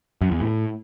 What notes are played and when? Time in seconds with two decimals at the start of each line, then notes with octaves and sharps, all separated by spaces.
0.21 F#2
0.31 E2
0.41 A2